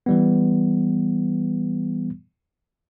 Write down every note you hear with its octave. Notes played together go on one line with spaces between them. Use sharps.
E3 G3 B3